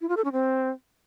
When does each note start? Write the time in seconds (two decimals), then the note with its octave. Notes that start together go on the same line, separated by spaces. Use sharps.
0.01 E4
0.09 F4
0.17 A4
0.24 C#4
0.32 C4